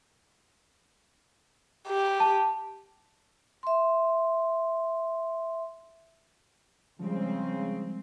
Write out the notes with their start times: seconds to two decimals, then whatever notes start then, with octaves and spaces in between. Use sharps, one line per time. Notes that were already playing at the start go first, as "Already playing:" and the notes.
1.88 G4
2.20 A5
3.63 E5 C6
6.99 C#3 F3 G3 G#3 C4